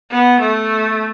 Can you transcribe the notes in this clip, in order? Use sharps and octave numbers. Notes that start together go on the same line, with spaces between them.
B3
A3